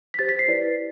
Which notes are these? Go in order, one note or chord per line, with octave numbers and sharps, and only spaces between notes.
B6
G4 C5 A6
B6
C7
E4 B4 D5